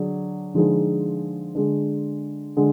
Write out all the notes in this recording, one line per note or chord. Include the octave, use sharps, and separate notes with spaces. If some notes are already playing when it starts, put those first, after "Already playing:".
Already playing: D3 F#3 D4 G#4
D3 F3 G#3 D#4 G#4
D3 G#3 D4
D3 G#3